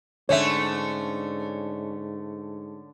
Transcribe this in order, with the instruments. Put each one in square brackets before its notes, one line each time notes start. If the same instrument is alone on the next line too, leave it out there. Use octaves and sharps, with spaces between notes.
[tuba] G#2 [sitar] D3 A3 C#4 [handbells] C#5 E5